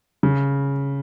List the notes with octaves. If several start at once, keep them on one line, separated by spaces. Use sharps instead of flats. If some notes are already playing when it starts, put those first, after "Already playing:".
C#3